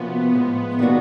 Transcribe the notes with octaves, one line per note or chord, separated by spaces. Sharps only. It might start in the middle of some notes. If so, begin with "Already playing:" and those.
Already playing: C3 F3 A#3 B3 C#4 F#4
A2 F3 G#3
D#3 G3 A#3 D4 F#4